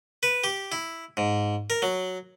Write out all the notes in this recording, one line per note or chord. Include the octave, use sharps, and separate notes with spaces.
B4
G4
E4
G#2
A#4
F#3